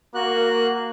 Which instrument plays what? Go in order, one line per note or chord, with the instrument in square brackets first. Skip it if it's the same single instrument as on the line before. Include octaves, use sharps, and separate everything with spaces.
[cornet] A#3 [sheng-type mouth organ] F#4 F#6